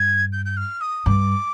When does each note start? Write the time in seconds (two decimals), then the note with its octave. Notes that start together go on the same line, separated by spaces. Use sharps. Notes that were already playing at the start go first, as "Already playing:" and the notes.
Already playing: G2 G#6
0.33 G6
0.46 G6
0.57 F6
0.81 D#6
1.06 G2 D6